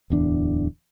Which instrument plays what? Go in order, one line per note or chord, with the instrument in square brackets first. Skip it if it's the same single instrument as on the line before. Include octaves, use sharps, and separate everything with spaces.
[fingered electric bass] D1 E2 D4